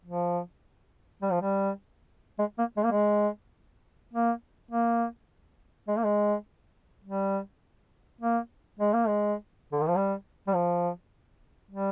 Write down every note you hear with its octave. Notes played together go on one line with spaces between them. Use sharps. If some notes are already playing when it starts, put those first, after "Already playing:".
F3
G3
F3
G3
G#3
A#3
G#3
A#3
G#3
A#3
A#3
G#3
A#3
G#3
G3
A#3
G#3
A#3
G#3
D3
D#3
F3
G3
G3
F3
G3